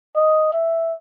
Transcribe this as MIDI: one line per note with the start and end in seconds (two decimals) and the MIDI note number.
0.15 0.51 75
0.52 0.93 76